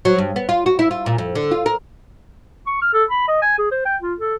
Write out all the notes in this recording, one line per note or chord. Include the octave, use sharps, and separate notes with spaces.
F#3
G2
B3
F4
F#4
E4
F4
A#2
F2
D3
F4
A#4
C#6
F6
A4
B5
D#5
G#5
G#4
C5
G5
F4
A4